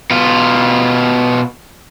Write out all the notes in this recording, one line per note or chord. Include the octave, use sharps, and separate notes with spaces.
B2 F4